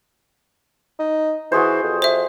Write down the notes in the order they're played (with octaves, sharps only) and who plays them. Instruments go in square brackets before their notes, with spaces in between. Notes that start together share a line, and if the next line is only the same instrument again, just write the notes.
[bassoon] D#4
[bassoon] E3 [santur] F#4 G#4 C5
[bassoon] F2
[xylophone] C5 E5